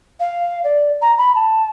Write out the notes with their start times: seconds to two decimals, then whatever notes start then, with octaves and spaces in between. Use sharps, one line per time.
0.20 F5
0.64 D5
1.02 A#5
1.18 B5
1.35 A5